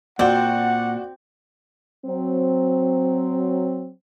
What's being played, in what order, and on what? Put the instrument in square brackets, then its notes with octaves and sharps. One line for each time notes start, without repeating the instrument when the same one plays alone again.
[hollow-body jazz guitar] A#2 [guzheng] C4 [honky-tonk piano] F#4 D5 [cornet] F#5
[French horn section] F#3 C4